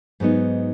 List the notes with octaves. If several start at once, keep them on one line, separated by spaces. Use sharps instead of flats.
G#2 F#3 B3 D#4